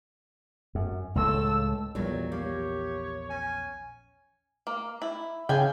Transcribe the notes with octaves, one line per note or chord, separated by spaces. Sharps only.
F#2
C#2 A2 A4 E6
A#1 E2 A#2 F#3 G3 C#5
A#3 G4 C#5
C#4 G#5
A#3
E4
C#3 G5 G#5